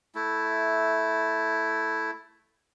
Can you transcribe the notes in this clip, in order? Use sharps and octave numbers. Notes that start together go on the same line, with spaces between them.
A3 E4